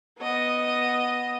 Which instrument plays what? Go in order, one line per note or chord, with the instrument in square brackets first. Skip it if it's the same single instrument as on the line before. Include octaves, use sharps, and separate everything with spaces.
[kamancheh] B3 D#5